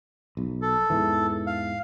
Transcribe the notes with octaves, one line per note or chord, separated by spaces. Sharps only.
B1
A4
E2 G#2 E3
F5